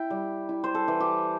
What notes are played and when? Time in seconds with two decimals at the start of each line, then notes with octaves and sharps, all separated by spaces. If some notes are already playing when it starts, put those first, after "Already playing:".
Already playing: E4 G5
0.10 G3
0.49 E4
0.64 C5
0.75 A4
0.88 E3
1.00 G4